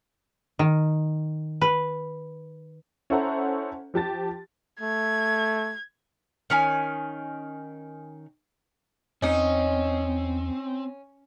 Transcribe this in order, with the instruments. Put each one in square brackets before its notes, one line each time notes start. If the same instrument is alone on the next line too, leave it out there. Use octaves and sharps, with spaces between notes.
[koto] D#3
B4
[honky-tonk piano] C#4 E4 A4 C5 F#5 A#5
F3 G4 A5 A6
[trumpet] A3 [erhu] G#6
[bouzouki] D#3 C#4 G#5
[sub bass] E2 [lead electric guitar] C4 [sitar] C#4 [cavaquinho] D#4 D#5